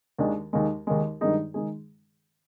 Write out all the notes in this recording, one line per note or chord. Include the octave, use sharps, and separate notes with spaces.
D#2 D#3 G#3 D4
D#2 D#3 G#3
D#2 D#3 G#3
G2 D#3 G#3 D#4 G#4
D#3 G#3 D#4 G#4